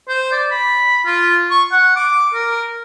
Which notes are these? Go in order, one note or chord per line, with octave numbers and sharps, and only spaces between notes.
C5
D5
B5
F4
C#6
F#5
D6
A#4